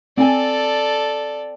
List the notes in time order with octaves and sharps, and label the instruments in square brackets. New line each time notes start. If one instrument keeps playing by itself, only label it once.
[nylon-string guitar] C4 G5 G#5 [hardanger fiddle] A4 D5